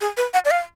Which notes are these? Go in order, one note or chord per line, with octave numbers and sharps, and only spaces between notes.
G#4
B4
F#5
D5
F5